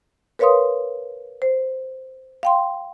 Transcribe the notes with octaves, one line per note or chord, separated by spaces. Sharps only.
A#4 B4 C#5 F5 C6 D#6
C5
F5 G5 C6